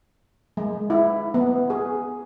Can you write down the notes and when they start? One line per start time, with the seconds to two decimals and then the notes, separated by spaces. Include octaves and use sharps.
0.57 G#3
0.90 E4
1.34 B3
1.70 G#4